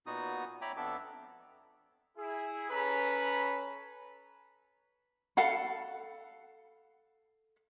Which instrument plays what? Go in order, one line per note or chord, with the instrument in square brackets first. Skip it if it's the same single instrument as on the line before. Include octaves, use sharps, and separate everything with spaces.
[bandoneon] A#2 B3 D#4 F#4 D#6
C#5 E5 G5 A#5 B5 D6
F2 B3 D4 A4 E5 D6
[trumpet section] E4 G#4
C#4 A4 B4 A#5 B5
[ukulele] A4 F5 F#5 B5